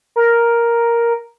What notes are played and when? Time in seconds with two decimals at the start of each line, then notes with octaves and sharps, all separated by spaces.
0.16 A#4